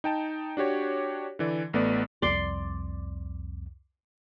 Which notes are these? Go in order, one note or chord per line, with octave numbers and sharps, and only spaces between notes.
D#4 G5 A5
D4 F#4 G4 C#5
D3 E3 D5
A1 A3 B3 D5
C2 F2 D5 C6